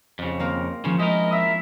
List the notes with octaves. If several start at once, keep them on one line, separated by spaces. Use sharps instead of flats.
F2 C#3
A#3 C4 A#4
C#3 F3 C#4
G#3 E4 A#4 D#5
E5 E6